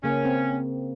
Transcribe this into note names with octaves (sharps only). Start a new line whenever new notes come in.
C#3 A#3 C#4
C4